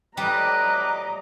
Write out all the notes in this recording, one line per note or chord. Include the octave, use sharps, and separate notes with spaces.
A2 G3 B4 D#5 A#5 D6